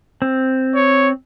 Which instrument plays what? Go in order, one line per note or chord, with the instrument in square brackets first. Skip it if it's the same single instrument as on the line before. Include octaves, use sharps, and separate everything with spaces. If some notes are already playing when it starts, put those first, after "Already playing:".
[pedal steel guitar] C4
[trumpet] C#5